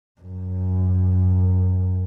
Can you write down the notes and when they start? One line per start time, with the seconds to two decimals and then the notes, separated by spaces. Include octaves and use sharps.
0.21 F#2